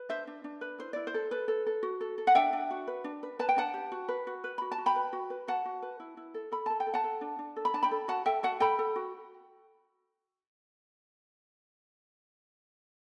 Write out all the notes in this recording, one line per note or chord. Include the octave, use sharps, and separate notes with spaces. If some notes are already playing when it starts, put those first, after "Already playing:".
Already playing: B4
D4 C5 E5
D4
D4
B4
E4 C5
E4 D5
C5
A4
A4 B4
A4
A4
F#4
A4
A4
F#5
D4 E5 G5
D4
F#4
B4
D4
B4
B4 A5
G5
D4 F#5 A5
G4
F#4
B4
F#4
B4
F#4 B5
A5
F#4
G5 B5
B4
F#4
B4
F#4 F#5 A5
F#4
B4
E4
E4
A4
A4 B5
A4 A5
G5
A4
F#5 A5
A4
D4
D4
A4
B5
D4 A5
G5 B5
A4
F#4 F#5 A5
A4 E5 G5
F#4 F#5 A5
A4 G5 B5
A4
F#4